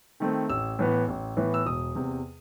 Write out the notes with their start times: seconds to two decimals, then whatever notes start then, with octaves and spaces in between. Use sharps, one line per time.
0.20 D#3 A3 C4
0.49 A1 E6
0.79 A2 E3 B3
1.08 A1
1.37 A2 E3 B3
1.54 E6
1.66 E1 D#6
1.95 E2 C3